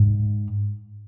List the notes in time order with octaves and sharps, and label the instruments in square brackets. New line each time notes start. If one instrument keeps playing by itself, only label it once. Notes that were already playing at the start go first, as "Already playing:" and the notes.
Already playing: [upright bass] G#2